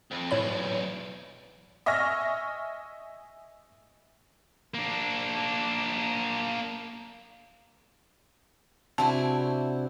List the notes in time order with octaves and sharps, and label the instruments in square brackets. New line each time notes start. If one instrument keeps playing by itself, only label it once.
[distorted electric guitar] F2
[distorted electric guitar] B1 E2 [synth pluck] A2 C#5 B5
[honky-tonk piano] D#5 E5 G#5 C#6 F6 A#6
[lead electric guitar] A#3 D4
[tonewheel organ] C3 D4 F#4 [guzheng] C4 E4 G#5 [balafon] A5